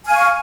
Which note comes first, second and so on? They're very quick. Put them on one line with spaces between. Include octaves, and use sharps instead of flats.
G#5 F6 F5 C#6